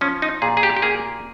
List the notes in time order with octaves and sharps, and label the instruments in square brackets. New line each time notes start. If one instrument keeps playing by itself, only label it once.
[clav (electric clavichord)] F3 C#4
D#4
A#2 G#4
G#4
G4
G4
A#3 G#4